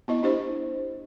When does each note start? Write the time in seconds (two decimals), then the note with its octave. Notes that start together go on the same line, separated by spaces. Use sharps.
0.08 B3 E4 D#5
0.23 D4 E4 G4 C5 D#5